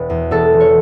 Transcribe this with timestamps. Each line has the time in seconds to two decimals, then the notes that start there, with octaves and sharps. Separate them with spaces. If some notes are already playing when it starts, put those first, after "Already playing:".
Already playing: E1 B4
0.10 E2
0.31 E1 A4
0.53 E3
0.60 C#5